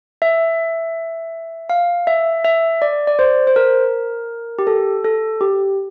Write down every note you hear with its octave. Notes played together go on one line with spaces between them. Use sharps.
E5
F5
E5
E5
D5
D5
C5
C5
A#4
G4
A4
A4
G4